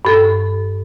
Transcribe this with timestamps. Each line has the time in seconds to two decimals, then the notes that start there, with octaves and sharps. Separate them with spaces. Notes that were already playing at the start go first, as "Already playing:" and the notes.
0.05 G2 A4